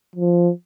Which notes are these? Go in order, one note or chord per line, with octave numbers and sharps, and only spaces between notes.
F3